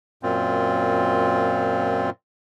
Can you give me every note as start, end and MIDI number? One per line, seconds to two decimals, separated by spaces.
0.23 2.10 42
0.23 2.10 46
0.23 2.10 60
0.23 2.10 65